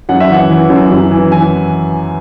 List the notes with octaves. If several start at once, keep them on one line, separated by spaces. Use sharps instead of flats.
F#2 F#5
E5
E3 F#5
E3
F#2
F#2
E3
E3 G#5